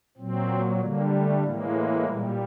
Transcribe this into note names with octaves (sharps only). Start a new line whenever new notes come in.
A#2 F#3 C4
D3 G3 A#3
A3
A2 E3 G#3 A#3
A#2 G3